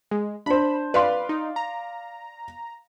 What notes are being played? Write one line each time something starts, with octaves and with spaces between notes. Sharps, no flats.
G#3
D4 C5 B5
B4 D5 F5 C6
D#4
A#5